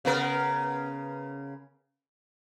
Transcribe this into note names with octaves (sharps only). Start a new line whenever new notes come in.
C#3 B3 A#4